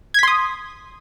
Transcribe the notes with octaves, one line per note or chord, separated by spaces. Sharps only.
C6 D#6 G#6 B6